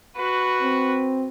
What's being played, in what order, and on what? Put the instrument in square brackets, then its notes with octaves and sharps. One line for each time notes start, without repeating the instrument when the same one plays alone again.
[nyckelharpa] F#4 B4
[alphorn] C4